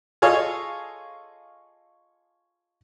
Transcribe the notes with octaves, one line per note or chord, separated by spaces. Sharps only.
F4 G#4 A4 C#5 D#5 F5